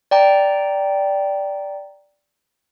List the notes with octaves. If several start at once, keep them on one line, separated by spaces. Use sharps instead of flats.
D5 G5 A#5